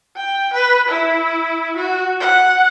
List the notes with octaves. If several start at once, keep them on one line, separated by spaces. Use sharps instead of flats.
G5
B4
E4
F#4
F#5